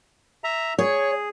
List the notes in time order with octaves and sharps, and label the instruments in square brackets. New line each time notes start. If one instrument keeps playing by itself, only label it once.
[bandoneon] E5 A#5
[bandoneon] G#4 [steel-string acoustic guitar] C#5